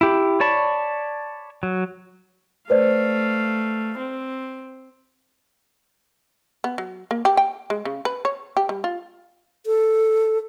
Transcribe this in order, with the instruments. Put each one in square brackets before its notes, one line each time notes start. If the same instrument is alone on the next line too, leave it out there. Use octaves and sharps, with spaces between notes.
[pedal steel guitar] E4 G4
C#5 D5 A5 B5 C#6
F#3
[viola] A3 F5 [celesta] B4 C5 D5
[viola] C4
[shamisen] B3
F#3
A#3
G4
G5
G#3
C#3
B4
C#5
G4
G3
F4
[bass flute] A4